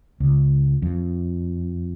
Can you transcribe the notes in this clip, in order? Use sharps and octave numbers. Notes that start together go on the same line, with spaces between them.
C#2
F2